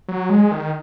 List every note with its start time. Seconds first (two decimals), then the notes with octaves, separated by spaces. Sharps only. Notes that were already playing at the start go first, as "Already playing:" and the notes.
0.09 F#3
0.30 G#3
0.52 D#3